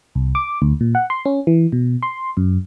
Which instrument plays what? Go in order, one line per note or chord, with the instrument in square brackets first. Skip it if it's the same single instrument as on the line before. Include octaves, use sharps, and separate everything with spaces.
[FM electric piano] C2
D6
D2
A#2
F#5
C6
C#4
E3
B2
C6
F#2